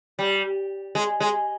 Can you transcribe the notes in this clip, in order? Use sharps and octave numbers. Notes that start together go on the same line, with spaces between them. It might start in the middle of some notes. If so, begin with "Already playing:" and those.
G3
G#3
G#3